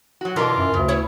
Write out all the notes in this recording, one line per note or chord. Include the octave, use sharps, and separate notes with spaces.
F#3 F#4
B2 D3 E3 F4 A#4
F#2
D2 C#3
B3 E4 C#5